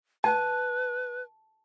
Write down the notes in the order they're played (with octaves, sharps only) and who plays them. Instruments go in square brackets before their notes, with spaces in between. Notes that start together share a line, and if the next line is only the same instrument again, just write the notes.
[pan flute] B4 [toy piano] A5